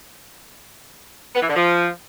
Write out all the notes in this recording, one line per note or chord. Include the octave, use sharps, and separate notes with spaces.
B3
E3
D3
F3